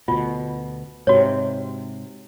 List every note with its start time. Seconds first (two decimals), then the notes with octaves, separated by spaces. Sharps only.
0.08 D2 B2 F4
1.07 G#2 C3 F#4 C#5